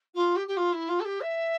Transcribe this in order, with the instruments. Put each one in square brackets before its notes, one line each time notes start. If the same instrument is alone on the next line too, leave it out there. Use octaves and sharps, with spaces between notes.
[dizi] F4
G4
G4
F4
E4
F4
A4
G4
E5